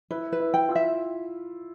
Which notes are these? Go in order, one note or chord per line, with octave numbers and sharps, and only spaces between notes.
E4 B4
B4
E4
G5
F4
E5